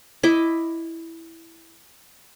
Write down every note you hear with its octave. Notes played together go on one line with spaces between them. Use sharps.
E4 D#5 D6